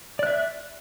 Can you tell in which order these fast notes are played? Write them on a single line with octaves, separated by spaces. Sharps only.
D5 F#6 E5